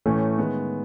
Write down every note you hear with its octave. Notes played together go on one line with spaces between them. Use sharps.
A2 E3 A3 C#4
D#3 G#3 B3